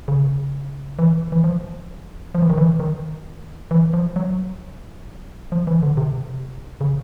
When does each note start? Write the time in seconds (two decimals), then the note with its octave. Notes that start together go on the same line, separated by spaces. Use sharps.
0.08 C#3
0.99 E3
1.32 E3
1.44 F3
2.35 F3
2.42 E3
2.50 D#3
2.58 E3
2.80 D#3
3.71 E3
3.93 F3
4.16 F#3
5.52 F3
5.67 E3
5.83 D3
5.97 C3
6.81 C#3